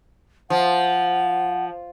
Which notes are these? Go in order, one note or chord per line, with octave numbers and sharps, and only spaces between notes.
F3 F#5